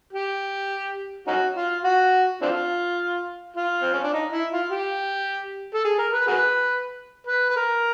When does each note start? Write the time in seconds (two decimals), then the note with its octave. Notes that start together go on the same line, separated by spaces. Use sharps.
0.13 G4
1.27 C#4 D#4 F#4
1.57 F4
1.84 F#4
2.41 C4 D4 F4
3.56 F4
3.82 C4
3.93 C#4
4.03 D4
4.14 D#4
4.32 E4
4.52 F4
4.70 G4
5.74 A4
5.85 G#4
5.99 A#4
6.13 B4
6.27 F#4 G#4 B4
7.27 B4
7.50 B4
7.56 A#4